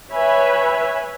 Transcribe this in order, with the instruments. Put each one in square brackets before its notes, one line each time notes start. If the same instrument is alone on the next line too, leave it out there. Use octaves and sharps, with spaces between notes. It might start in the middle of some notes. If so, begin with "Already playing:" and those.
[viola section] B4 C#5 E5 G#5 B5